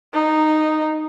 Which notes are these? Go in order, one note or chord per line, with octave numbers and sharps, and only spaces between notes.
D#4